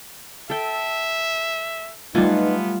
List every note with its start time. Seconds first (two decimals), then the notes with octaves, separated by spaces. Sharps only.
0.50 A4 E5 G5
2.15 G3 A3 B3 D#4 F4 B4 F#5 G#5